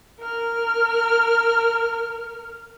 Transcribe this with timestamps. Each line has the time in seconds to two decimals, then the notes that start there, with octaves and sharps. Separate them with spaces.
0.19 A#4 F6